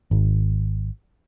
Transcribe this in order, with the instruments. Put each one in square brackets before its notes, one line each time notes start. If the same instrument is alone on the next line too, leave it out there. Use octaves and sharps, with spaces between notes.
[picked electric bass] G#1